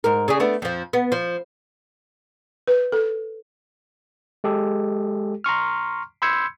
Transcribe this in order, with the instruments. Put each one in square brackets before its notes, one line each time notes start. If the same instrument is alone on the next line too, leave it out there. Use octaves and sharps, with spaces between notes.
[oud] G#2 A#4
C#3 D4 G#4
A3 B3 D4
F2 F3
B3
F3
[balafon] B4
A4
[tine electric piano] G#3 G4 A4
A#5 C6 C#6 F6
B5 C6 E6 G6 G#6 C#7